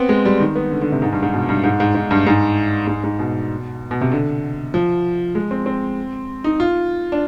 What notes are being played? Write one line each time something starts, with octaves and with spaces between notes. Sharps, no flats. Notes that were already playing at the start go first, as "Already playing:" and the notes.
Already playing: B3 C4
G#3
G3
D#3
B3
D3
D3
C3
G#2
G2
G#2
B2
G2
G#2
G#2
G#2
G2
G#2
G#2
G#2
B2
B2
C3
D3
F3
G#3
C4
C4
D#4
F4
D4